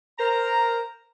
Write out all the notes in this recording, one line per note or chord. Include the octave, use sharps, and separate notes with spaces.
A#4 C5 A#5